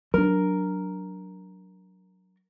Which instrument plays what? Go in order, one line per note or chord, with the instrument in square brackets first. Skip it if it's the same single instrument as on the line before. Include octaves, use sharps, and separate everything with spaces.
[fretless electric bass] F#3 D4 [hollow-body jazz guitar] A#4